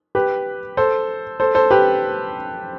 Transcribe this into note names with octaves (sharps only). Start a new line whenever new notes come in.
G4 B4
A4 C5
A4 C5
A4 C5
G4 B4